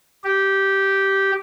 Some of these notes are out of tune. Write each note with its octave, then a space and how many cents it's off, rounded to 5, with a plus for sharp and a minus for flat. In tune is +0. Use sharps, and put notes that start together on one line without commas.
G4 -10